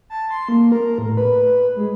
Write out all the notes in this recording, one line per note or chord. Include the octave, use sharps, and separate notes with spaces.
A5
C6
A#3
A#4
A2
B4
G#3